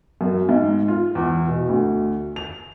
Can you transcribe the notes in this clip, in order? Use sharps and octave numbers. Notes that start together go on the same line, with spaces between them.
F#2
G#2
F4
E2
B2
D2
F7